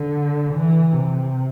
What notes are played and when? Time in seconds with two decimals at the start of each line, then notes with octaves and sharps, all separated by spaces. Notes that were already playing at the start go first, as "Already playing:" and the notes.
Already playing: D3
0.54 E3
0.93 C3